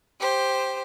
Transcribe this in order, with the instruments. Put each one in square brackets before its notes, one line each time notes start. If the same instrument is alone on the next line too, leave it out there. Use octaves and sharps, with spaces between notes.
[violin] G4 C5